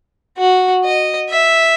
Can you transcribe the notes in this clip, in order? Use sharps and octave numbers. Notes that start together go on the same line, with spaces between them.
F#4
D#5
E5